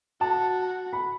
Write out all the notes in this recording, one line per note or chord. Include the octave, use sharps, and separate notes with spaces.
F#4 A5
B5